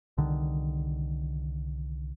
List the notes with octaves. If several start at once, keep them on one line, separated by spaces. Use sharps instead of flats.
C2 D3 D#3